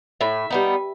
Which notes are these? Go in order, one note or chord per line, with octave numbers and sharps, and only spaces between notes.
A2 E5
G3 B3 D#4